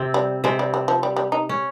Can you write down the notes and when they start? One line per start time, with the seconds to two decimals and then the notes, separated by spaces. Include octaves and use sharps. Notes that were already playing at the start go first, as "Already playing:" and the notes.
Already playing: C3 C4
0.14 G3
0.44 C3 G#3 C4
0.59 G3
0.74 G3
0.88 F3
1.03 G3
1.16 G3
1.32 D#4
1.49 C#4